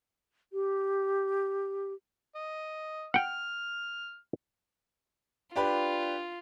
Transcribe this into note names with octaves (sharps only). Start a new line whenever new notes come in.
G4
D#5
F#5 G5 F6
D4 F4 G4 B4